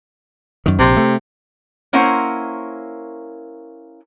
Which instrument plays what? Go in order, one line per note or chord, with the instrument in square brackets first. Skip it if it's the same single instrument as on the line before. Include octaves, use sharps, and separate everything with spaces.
[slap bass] F#2 D#3
[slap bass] A#1 [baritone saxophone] C3
[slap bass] A3
[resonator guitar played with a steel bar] A#3 C#4 E4 A#4 C5 F#5